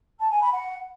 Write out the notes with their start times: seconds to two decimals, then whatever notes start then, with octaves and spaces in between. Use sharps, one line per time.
0.19 A5
0.30 G#5
0.41 B5
0.52 F#5